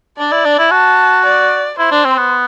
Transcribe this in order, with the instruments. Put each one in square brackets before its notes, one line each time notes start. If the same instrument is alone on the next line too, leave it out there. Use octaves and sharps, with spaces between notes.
[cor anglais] D4 [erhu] D5
[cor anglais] E4
D4
E4
[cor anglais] F#4 [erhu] A5
[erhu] D5
[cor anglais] E4 [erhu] C5
[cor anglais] D4
C4
B3